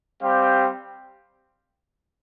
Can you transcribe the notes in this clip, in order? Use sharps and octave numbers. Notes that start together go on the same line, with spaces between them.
G3 C4 G4 C5 F5